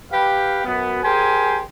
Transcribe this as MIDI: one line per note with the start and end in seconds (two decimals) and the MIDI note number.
0.11 0.64 67
0.11 0.64 71
0.11 0.64 77
0.65 1.00 42
0.65 1.00 59
1.03 1.60 67
1.03 1.60 68
1.03 1.60 70
1.03 1.60 72
1.03 1.60 80